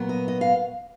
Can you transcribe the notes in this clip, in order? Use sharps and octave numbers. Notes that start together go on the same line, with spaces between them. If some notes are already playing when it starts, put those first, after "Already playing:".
Already playing: A#2 F#3 B3
D#5
D#5
F5